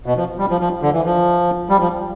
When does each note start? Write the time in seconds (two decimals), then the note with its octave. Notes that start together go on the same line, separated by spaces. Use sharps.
0.06 B2
0.17 F3
0.38 G3
0.50 F3
0.61 F3
0.83 D3
0.93 E3
1.05 F3
1.70 G3
1.80 F3